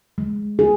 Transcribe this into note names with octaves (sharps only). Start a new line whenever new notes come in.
G#3
G#4